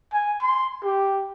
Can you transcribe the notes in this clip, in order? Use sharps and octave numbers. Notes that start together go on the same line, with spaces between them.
G#5
C6
G4